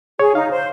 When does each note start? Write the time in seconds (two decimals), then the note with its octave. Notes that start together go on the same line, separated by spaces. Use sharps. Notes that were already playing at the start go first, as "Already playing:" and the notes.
0.19 G#4 C#5
0.35 D#4 F5
0.51 C5